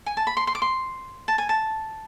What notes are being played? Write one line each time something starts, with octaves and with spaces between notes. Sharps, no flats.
G#5
A5
B5
C6
C6
D6
C6
A5
G#5
A5